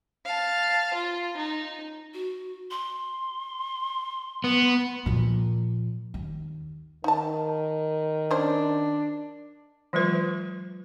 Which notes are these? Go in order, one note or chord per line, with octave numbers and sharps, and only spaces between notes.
F5 A5
F4
D#4
F#4
C6
B3
A#2 F3
D#2
D#3 D#4 A5
C#4 D4 C5
E3 F#3 G#3 F4 B4